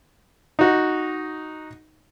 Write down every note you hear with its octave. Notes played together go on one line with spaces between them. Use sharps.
D#4 F#4